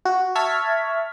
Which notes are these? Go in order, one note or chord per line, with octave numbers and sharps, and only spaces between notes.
F#4
E5 A5 C#6 F6 G#6 B6